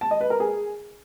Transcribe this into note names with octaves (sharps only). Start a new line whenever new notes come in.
A5
D#5
B4
A#4
G#4